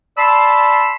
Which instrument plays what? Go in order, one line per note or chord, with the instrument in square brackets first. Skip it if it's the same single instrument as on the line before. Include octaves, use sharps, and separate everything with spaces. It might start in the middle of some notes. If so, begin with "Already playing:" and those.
[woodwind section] D5 A5 B5 C6 E6